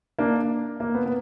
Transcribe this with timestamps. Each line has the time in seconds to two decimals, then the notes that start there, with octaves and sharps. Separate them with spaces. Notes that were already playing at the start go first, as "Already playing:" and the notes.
0.19 A#3 D4
0.80 A#3
0.95 B3
1.06 B3